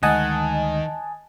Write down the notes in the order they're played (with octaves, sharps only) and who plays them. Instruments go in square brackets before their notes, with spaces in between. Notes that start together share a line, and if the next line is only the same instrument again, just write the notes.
[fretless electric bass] D2 G#3 [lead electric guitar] D#3 [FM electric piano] D#5 G#5 A5 [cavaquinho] F#5